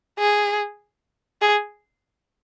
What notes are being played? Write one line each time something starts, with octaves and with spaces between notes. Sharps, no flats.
G#4
G#4